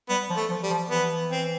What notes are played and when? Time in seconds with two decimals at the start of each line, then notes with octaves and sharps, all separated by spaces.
0.09 G3 B3
0.30 F3
0.37 A3
0.50 F3
0.63 G3
0.70 F3
0.90 E3 B3
1.31 C4